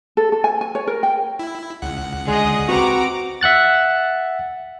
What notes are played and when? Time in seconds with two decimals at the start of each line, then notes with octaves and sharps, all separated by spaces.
0.17 A4
0.32 A4
0.44 G#5
0.61 G#5
0.75 C#5
0.87 A#4
1.03 G5
1.39 E4
1.82 C#2 F#5
2.27 D3 G#3 G#4 D#5
2.68 C4 F#4 G4 B4 A#5 D6
3.41 E5 F#5 F#6 A6